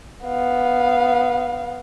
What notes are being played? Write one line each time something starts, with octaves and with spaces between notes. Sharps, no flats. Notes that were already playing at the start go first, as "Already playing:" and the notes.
B3 F5